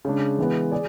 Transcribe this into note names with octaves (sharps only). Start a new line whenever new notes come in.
C#3 G#3 D4
E3 G#3 B3
G#4 D5